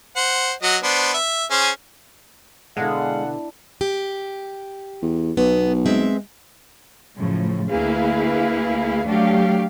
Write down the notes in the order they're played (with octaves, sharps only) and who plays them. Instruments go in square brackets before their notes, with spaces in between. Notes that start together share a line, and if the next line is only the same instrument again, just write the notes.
[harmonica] C5 F#5
F#3 D#5 F#5
B3 D4 C5
E5
C#4 G#4 C5
[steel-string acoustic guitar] B2 D3 [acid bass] G#3 [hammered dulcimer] D4 E4 [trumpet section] F5 F#5
[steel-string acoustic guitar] G4
[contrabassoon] E2
[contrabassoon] B1 [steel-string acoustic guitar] B3
[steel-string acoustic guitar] G#3 C4 E5
[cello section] F#2 A2 C#3 F3
D2 A#3 E4 G#4 B4 F5
F#3 A3 D4 G4 F5